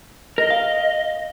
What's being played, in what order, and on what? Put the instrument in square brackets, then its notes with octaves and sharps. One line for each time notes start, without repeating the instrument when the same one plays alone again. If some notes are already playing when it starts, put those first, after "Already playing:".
[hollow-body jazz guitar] A#4 [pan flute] D#5
[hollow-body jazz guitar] F5